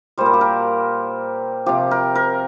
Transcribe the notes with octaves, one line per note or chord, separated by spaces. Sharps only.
A#2 G3 C5
A#4
G4
A#4
C3 F3 G4
A#4
A#4